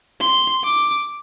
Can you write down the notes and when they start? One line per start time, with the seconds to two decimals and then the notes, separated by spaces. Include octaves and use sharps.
0.20 C6
0.64 D6